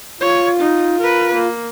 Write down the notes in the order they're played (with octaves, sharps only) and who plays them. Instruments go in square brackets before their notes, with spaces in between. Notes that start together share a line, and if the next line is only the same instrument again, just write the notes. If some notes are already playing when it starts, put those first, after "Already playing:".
[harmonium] F4 [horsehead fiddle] C#5
[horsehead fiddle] D#4
A#4 B4
A#3